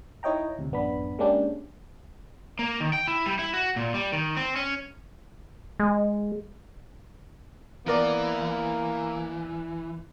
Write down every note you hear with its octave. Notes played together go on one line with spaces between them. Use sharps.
D#4 E4 C#5 D#5 G5 A#5
D2 C3
A1 F#2 B3 D4 B5
G#3 A#3 C#4 D4 G4
A#3
D#3
G5
E4
G3
E4
F#4
A#2
G3
D#3
C4
C#4
G#3
E3 A#3 B3 A#4 D5